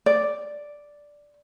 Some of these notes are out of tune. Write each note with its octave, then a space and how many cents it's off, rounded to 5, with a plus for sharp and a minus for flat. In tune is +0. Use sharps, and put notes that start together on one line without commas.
D5 +0